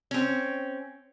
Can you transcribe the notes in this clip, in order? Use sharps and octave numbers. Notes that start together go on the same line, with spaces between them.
C4 C#4